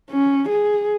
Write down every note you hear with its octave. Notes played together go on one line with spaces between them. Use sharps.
C#4
G#4